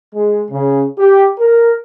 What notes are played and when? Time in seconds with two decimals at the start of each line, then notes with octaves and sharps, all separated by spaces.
0.14 G#3
0.51 C#3
0.98 G4
1.39 A#4